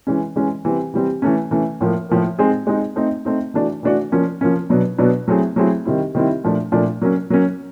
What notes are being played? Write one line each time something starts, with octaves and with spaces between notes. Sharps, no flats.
E3 G#3 C#4
E3 G#3 C#4
E3 G3 C4
E3 G3 C4
E3 A3 C#4
E3 A3 C#4
A2 F3 A#3
A2 F3 A#3
G#3 C4 D#4 G#4
G#3 C4 D#4 G#4
A3 C4 D#4
A3 C4 D#4
E3 A3 D4 F#4
E3 A3 D4 F#4
F3 A#3 C#4
F3 A#3 C#4
B2 F#3 B3 D4
B2 F#3 B3 D4
F#3 A3 C4 E4 G#4
F#3 A3 C4 E4 G#4
D#3 G3 C4 E4
D#3 G3 C4 E4
A#2 F3 A3 D4
A#2 F3 A3 D4
F#3 A#3 C#4
F#3 A#3 C#4